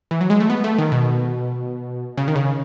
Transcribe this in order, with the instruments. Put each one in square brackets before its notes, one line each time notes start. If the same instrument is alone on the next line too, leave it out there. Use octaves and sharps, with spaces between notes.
[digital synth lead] E3
F#3
G#3
A3
B3
A3
D#3
B2
C#3
D#3
C#3